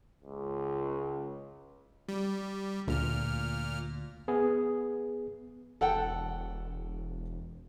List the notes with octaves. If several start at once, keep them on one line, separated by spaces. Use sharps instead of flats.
C#2
G3
D2 A#2 F6
B3 G#4
E1 A4 F#5 G5